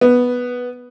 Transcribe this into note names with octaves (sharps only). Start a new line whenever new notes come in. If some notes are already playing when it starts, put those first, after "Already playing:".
B3